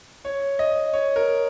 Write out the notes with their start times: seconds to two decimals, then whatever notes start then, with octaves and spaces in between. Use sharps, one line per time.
0.25 C#5
0.59 D#5
0.93 C#5
1.16 A#4